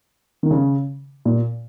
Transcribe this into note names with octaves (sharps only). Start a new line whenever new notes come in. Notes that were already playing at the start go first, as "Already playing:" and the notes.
D#3
C#3
A#2